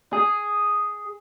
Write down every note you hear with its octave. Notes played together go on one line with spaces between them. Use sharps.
G#4